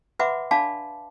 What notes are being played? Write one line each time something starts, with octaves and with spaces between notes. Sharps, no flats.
B4 E5 F#5 B5 C6 D6
D4 D5 F5 A5 B5 D6